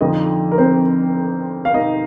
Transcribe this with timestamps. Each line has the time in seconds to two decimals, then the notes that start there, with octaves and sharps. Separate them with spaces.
0.01 F2 D3 F3 D#4 D#5
0.52 A#4
0.58 C4 C5
1.65 F5
1.74 D#4 D#5